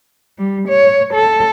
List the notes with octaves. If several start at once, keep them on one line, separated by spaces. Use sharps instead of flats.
G3
C#5
A4